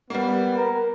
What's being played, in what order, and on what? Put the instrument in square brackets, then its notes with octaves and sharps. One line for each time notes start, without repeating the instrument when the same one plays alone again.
[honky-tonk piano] G3 A#3 [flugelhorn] B3
[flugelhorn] A#4